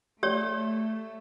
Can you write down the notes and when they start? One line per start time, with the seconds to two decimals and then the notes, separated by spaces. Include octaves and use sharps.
0.23 A3 G4 C#5 D5